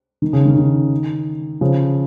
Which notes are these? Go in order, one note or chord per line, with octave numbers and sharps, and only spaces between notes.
D#3
C#3
D#3
D#3
C#3 F3